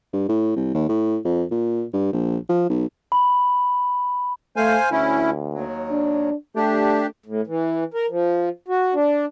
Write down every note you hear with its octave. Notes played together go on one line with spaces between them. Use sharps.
G2
A2
C2
D#2
A2
F2
A#2
G2
A#1
F3
B1
B5
A3 C5 F5 G#5
D2 C#4 E4
D#2 F#3
D4
A3 D4 G4
A2
E3
A#4
F3
F#4
D4